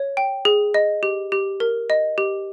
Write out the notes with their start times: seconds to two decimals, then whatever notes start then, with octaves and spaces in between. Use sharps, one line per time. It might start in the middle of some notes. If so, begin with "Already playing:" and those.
Already playing: C#5
0.17 G5
0.45 G#4
0.74 D#5
1.03 G4
1.32 G4
1.60 A#4
1.90 D#5
2.18 G4